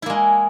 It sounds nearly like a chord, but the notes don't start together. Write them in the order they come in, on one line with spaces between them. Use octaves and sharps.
E4 A#3 G#3